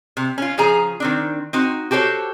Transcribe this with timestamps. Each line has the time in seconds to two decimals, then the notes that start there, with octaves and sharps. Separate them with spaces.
0.17 C3
0.38 C#4 F4
0.58 C#3 F3 G#4 A#5
1.00 D#3 C4 D4
1.53 C4 D#4 F#4
1.91 F#4 G4 A4 C5 C#5